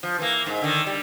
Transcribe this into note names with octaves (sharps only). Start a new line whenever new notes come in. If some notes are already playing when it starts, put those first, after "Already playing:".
F3
E3 A#3
G#2
D3 D#3
G3